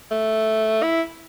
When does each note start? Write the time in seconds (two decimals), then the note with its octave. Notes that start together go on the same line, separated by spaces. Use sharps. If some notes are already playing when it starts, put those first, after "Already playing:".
0.11 A3
0.83 E4